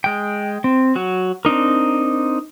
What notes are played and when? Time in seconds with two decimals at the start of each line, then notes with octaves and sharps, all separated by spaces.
0.04 G#3 G5
0.64 C4
0.95 F#3 F#4
1.45 C4 D4 D#4 A#4